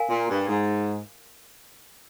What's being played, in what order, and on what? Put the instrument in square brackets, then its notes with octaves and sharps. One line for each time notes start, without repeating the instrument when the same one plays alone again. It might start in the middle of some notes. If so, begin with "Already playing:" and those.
Already playing: [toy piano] A#4 F5 G#5
[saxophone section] A#2
G2
G#2